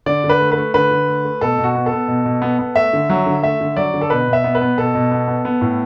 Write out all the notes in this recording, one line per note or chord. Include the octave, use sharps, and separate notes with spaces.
D3 D5
D3
B4
A3
B4
A3
D3 B4
D3
A3
A3
B2 A4
B2
F#4
B3
A4
B3
B2
B2
B3
B3
A3 E5
D3
F#3
D3
A3 E5
D3
F#3 D5
D3
A4
B2 B4
B2
E5
B3
B4
B3
B2 A4
B2
B3
B3
B3
A2